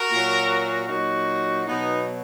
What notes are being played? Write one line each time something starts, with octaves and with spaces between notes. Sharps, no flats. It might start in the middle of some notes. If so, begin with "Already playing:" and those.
Already playing: F#4 A#4
A#2 F#3
A#2 F#3 D#4 F#4
B2 F#3 B3 D#4